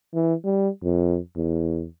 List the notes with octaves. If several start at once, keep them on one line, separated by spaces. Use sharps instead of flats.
E3
G3
F2
E2